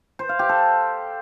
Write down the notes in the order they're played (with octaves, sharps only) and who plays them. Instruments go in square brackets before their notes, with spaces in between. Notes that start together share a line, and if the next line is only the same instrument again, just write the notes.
[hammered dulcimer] C5
F5
G4
A4